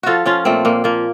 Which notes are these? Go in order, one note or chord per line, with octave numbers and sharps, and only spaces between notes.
F3 F4 F#4 A4
F3 C#4 F4
A#2 A3 C4
A#2 A#3
F3 A#3